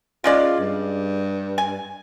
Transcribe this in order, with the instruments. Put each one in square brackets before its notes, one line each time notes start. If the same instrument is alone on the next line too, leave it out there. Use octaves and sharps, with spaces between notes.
[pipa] C#3 G#3 D5 [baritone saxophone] F4
[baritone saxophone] G2
[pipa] G#5